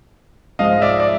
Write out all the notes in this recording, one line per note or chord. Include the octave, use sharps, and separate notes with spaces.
G#2 F3 G#3 D#5 F5
D5 E5
D5